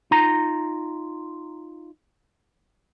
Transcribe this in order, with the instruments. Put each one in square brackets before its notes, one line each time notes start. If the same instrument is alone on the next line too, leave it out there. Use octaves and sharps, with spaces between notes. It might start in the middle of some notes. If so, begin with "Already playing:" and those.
[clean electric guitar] D#4 F4 A#5